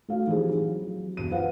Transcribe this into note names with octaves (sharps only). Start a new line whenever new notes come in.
A3 F#4 F5
E3 F3 C4 D#4 G4 G#4
F#3
E1 F#2 D#7
F4 B4 C5 F5 F#5